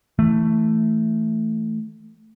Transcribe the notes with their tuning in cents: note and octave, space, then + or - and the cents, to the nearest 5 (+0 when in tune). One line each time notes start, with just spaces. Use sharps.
E3 -5 A3 +5